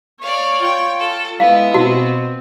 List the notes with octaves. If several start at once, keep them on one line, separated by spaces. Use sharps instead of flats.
C#5 D5 F5
F4 G5
A4
G#3 B3 E4 F5
B2 C4 F#4